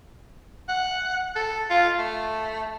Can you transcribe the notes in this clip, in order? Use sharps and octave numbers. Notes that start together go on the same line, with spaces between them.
F#5
A4
F4
A3